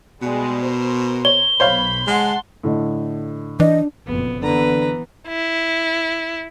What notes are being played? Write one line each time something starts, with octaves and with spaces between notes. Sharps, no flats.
B2 G3 G#3
A#4 C5
C#5 G7
B1 C5 C#5 F5 B5
G#3 F#5 A5 C6
A2 D3 D#5
E3 D4 D#5
F#1 F2 A#2 B3
D3 E3 B3 B4 A#5
E4